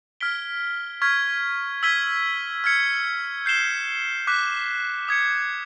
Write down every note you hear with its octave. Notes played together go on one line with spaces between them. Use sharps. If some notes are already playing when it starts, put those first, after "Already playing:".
F6 G#6 B6 D7 G7
C#6 F6 G#6 B6
E6 G#6 B6 D#7 G7
F6 G#6 C#7
G6 C7 E7 G7
D6 F#6 B6
D#6 G#6 C#7